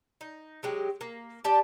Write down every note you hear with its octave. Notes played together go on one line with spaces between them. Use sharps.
D#4
F#3 G#3 G4
A#3
G4 D5 A5